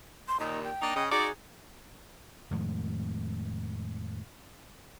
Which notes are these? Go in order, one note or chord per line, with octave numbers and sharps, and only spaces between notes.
C6
D#2 A#2 D#4
G5
A#3 D4 D#4
C#3 D#5
D#4 F#4 G#4 D5
F2 A2 D#3 G#3